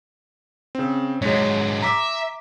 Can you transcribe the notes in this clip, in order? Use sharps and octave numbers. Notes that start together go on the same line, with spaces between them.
C#3 C4
G#2 F#3 G#3 C#5
E5 A#5 D6 B6